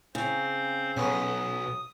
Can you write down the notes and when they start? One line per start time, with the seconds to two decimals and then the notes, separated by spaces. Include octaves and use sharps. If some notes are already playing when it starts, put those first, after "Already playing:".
0.15 C#3 C4 C5
0.97 B1 B3 C#4 D#6